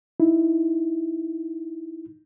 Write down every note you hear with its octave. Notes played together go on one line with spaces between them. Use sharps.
D#4 E4